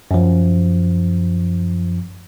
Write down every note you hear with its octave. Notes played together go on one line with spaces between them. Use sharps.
F#2 F3